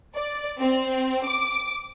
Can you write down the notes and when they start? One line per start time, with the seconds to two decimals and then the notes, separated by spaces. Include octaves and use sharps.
0.16 D5
0.61 C4
1.26 D6